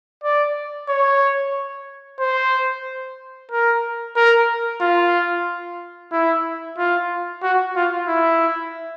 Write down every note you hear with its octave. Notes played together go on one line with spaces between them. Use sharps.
D5
C#5
C5
A#4
A#4
F4
E4
F4
F#4
F4
E4